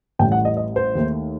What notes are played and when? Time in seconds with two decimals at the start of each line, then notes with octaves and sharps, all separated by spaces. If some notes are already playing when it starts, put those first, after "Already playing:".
0.19 A1 A2 G3 G5
0.32 F#5
0.45 D#5
0.57 D#5
0.76 C5
0.95 D#2 D#3 A3